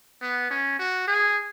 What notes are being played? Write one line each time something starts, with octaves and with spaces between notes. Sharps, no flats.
B3
C#4
F#4
G#4